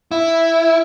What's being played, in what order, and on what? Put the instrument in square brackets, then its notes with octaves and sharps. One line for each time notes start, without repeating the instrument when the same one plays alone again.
[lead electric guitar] E4